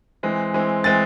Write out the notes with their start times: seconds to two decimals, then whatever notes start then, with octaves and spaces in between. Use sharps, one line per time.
0.23 E3 G#3 C4
0.54 E3 G#3 C4
0.84 E3 G#3 C4 A6